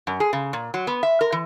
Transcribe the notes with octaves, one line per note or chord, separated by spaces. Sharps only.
F#2
G#4
C#3
A#2
F#3
B3
E5
A#4
E3